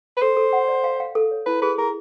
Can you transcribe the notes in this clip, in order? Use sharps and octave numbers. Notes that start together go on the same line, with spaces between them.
B4
A4 C5
A4
F#5
D5
F5
F5
A4
C#5
E4 B4
G#4 B4
G#4 A#4